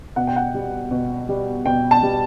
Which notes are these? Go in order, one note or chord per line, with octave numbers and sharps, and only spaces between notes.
B2 F#5
G5
F#5
G3
B2
G3
B2 G5
A5
G3